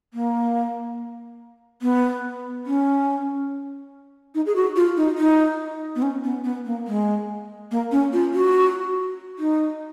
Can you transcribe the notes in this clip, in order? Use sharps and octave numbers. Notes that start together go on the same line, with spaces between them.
A#3
B3
C#4
D#4
G#4
F#4
F4
D#4
D#4
B3
C#4
B3
B3
A#3
G#3
A#3
C#4
F4
F#4
D#4